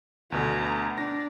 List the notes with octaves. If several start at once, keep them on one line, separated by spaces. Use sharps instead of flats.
D2 B2 D3 A#5
D4 A#6